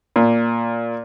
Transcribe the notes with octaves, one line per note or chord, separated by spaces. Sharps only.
A#2